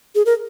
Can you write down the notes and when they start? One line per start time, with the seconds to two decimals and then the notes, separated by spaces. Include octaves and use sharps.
0.15 G#4
0.26 A#4